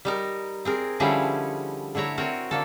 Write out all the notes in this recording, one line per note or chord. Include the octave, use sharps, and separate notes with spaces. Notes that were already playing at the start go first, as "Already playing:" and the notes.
G3 D#4 A#4
C4 G#4 A#4
D3 F3 G3 C#4 E4 G#4
D3 A3 E4 C#5 A#5
C4 F#4 A#4 C#5
D3 A#3 A4